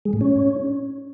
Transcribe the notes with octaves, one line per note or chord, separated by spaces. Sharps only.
G#3
A2
C#4